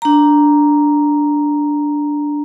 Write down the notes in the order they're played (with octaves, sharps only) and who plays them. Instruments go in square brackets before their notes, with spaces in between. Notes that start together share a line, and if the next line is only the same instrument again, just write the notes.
[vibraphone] D4 A#5